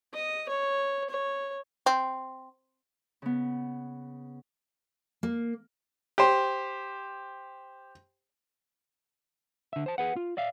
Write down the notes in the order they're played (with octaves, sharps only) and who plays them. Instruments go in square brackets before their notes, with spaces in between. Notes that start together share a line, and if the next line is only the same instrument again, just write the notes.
[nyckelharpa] D#5
C#5
C#5
[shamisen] C4
[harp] C#3 B3
[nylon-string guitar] A#3
[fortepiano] G4 C5
[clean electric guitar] D3 E5
C5 A5
G#4 B4 F#5
F4
D5 E5 F5